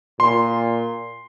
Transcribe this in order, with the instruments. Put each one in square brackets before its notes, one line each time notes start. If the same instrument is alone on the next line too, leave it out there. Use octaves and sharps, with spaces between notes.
[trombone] A#2 [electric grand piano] C6